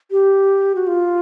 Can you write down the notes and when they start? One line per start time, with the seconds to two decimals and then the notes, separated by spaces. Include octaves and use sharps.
0.11 G4
0.75 F#4
0.87 F4